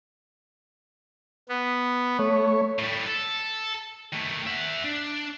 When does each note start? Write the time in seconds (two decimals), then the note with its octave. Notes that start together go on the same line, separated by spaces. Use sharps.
1.49 B3
2.19 A3 C#5
2.79 A2 G3
3.08 A4
4.12 D#3 A3
4.46 E5 F#5
4.84 D4